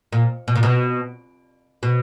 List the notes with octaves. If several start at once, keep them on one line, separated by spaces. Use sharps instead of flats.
A#2
B2
A#2
B2
B2